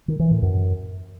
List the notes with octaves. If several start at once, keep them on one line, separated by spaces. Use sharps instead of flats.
D#3
E3
A2
F#2